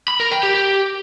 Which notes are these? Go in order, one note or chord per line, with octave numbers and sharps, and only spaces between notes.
B5
A#4
G5
G4
G4